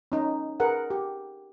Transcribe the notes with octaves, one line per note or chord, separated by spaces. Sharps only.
C#4 D#4
G#4 A#4 B4 F#5
G4